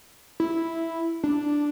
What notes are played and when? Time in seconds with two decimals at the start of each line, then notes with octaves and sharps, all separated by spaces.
0.40 E4
1.24 D4